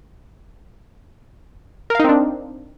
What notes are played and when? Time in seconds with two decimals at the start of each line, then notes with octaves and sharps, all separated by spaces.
1.90 A#4
1.95 F5
2.00 D#4
2.04 C4
2.09 D4